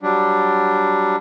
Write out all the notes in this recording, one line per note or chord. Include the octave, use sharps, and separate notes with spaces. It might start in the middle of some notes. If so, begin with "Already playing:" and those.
F#3 G3 D4